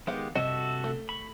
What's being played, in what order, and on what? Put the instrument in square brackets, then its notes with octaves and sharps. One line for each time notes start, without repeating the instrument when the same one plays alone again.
[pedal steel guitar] D#3 G#3 G4 [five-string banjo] B3 F5 F#5
[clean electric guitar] G2 C3 [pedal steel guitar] F#4 A4 E5 [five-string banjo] D#5
[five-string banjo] A3
[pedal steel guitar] B5 C#6